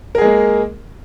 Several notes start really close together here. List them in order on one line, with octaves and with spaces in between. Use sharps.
A#4 G#4 G#3 A#3